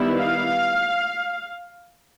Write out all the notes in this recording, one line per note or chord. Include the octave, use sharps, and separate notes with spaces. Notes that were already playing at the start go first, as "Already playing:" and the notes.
Already playing: D#3 G3 B3 E4
F5